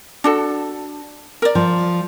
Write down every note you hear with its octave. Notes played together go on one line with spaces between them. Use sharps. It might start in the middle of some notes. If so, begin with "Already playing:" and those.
D4 F#4 A4
A#4 D5
F3